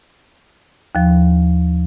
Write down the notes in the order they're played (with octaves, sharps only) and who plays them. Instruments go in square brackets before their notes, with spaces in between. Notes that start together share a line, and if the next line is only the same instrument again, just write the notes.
[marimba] D#2 F3